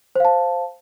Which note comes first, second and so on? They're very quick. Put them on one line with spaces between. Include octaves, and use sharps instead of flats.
C5 F5 A5